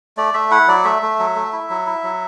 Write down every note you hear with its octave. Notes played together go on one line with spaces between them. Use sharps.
A3 D5
A3 E5
E4 F#5
F#3 D5
A3 E5
A3
F#3
A3
E4
F#3
E4
F#3